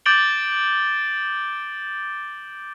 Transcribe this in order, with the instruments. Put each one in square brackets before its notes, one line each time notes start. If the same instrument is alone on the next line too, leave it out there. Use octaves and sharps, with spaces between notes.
[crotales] D6 G6 A6 D7 F#7 G7